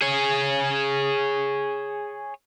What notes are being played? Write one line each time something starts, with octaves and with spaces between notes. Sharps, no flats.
G#4 C#5